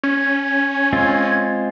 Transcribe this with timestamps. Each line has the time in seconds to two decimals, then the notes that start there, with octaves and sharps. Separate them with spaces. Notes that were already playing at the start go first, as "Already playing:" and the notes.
0.03 C#4 G#6
0.93 G#3 C4 F4